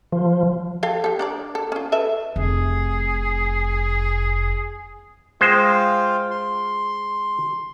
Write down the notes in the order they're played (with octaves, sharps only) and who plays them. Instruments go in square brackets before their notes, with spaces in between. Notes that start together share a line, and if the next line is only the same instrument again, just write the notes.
[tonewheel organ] F3
[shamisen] A4 F5 G5
G4 A4
D4 A#4 D5
A4
C#4 F4
A4 B4 E5
[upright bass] F1 [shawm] G#4
[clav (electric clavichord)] G#3 C5 [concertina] F4 F5 G5
[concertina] C6